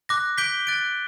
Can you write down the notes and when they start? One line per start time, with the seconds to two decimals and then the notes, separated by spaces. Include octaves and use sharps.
0.09 D6 F#6 A#6
0.37 D6 G6 B6 D7 G7
0.67 F#6 A6 D7